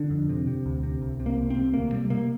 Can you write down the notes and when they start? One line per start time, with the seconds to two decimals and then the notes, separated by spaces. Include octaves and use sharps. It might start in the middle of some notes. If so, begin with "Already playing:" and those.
Already playing: D3 D4
0.10 F2
0.29 C3
0.47 C3
0.66 D2
0.83 C3
1.02 C2
1.20 C3
1.26 A#3
1.38 C2
1.50 C4
1.57 C3
1.74 D2 A#3
1.92 C3 G3
2.10 C3 A#3